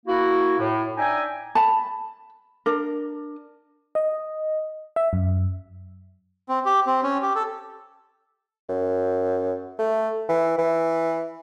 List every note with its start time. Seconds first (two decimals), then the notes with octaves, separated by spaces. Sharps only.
0.06 A#3 E4 F#4
0.58 A2
0.97 D4 D#4 E5 G5 G#5
1.55 A5 B5
2.66 D4 A#4
3.95 D#5
4.96 E5
5.13 F#2
6.49 C4
6.65 G4
6.86 C4
7.03 C#4
7.22 G4
7.35 A4
8.69 F#2
9.79 A3
10.29 E3
10.58 E3